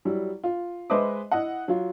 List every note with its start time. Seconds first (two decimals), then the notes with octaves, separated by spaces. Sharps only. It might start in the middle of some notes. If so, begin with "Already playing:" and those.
0.05 F#3 G3 E4
0.44 F4
0.90 G#3 B4 C5 D#5 E5 D6
1.31 E4 D#5 F#5
1.68 F#3 F4